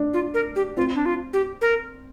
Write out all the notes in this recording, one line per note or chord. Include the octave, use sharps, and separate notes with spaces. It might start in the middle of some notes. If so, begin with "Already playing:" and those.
Already playing: D4
F4
A#4
G4
C4 F4
D4
F4
G4
A#4